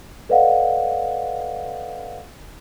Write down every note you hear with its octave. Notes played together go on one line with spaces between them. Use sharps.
A4 B4 D5 D#5 F5 F#5